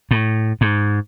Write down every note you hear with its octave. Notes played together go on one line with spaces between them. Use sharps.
A2
G#2